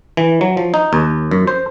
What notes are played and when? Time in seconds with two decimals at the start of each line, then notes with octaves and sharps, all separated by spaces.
0.17 E3
0.41 F#3
0.57 F3
0.74 D#4
0.93 D#2
1.31 F#2
1.47 C5